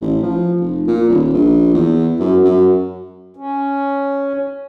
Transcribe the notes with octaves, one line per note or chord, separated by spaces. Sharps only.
A1
F3
F1
A#2
D#1
A#1
E2
F#2
F#2
C#4